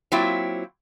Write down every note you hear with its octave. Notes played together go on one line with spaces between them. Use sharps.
F#3 A#3 C4 E4 F4 G5